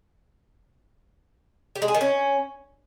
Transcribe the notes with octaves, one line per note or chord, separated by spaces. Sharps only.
G4
G#3
G#4
D#3
C#4